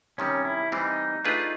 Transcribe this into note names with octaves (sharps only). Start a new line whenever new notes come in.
C3 D#3 G3 C#4
E4
E3 G3 C4 D#4
A3 D4 F4 G#4 B4